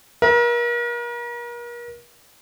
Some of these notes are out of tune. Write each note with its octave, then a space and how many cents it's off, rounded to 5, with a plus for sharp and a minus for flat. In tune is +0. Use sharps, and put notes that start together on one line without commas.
A#4 +40 E5 +0